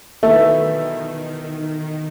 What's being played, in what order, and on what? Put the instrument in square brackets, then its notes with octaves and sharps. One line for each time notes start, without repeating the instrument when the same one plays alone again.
[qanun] B2 E3 F#3 [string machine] D#3 [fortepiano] A3 [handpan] E5